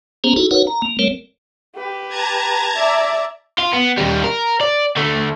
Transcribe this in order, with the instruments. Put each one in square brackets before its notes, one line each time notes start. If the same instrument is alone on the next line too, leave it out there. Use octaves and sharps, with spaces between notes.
[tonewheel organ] A#3 B3 C#4 G#4 C5 A#5
D#4 E4 F#4 G#4 A4
D#4 F#4 A#4 B4 C#5 F#5
A#5
A#3
G3 A3 C4 A#4 C#5
[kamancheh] G4 B4
[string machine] A5 A#5 G#6
[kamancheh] D5 E5
[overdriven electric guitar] F4
B3
D#2 G3
A#4
D5
D2 A3